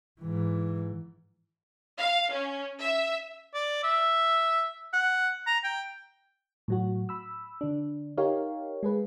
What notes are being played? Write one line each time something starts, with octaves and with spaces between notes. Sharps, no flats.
G#2 E3
F5
C#4
E5
D5
E5
F#5
A#5
G5
A2 F#3 F#4
B5 E6
D3 D4
D#4 G4 A#4 C#5 F5
G#3 G#4 B4